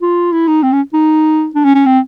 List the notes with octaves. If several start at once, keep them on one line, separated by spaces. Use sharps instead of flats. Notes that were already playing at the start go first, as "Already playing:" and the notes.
F4
E4
D#4
C4
C#4
D#4
D4
C#4
C#4
C4